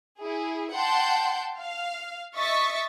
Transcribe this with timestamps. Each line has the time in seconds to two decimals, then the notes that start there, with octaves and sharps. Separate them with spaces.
0.20 E4 G#4
0.75 F#5 G5 A5 C6 G6
1.59 F5
2.36 D#5 E5 C#6 A6 B6 C#7